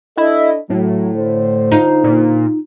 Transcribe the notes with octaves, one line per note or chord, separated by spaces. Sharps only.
D4 E4 A4 D#5
A2 F#3
D3 C5
D#4 F4
A#2